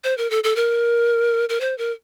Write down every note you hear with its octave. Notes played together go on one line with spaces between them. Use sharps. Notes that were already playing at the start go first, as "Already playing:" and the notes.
C5
A#4
A4
A4
A#4
A#4
C5
A#4